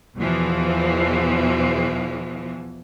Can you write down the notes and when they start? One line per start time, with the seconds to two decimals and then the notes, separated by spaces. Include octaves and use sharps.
0.17 E2 B2 E3 F3